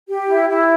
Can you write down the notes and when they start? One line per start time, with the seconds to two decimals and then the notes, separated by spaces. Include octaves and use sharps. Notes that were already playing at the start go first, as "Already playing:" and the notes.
0.08 G4
0.27 E4
0.49 E4